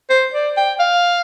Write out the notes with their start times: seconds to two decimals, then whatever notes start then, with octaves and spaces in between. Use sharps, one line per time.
0.10 C5
0.34 D5
0.57 G5
0.80 F5